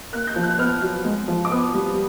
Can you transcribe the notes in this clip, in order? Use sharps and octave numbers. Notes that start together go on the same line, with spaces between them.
A#3 F#6
G6
F3
F#6
B3 F6
F#3
G#3
F3
D6
B3 D#6
G3